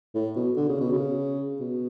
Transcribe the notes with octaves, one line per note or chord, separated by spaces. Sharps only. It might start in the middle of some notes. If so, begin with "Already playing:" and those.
A2
B2
D3
C#3
B2
C#3
B2